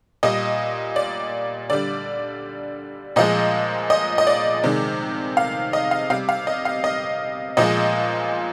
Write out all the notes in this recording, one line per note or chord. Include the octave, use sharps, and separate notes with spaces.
A#2 G3 D#5
D5
D3 G3 D5
A#2 F3 G#3 D#5
D#5
D#5
D5
C3 D#3 G#3
F5
D#5
F5
C3 G3 F5
F5
D#5
F5
D#5
A#2 F3 G#3 D#5